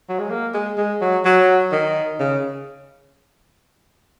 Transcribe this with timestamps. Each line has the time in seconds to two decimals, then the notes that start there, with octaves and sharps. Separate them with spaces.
0.09 F#3
0.19 G#3
0.30 A#3
0.54 G#3
0.78 G#3
1.01 F#3
1.25 F#3
1.72 D#3
2.19 C#3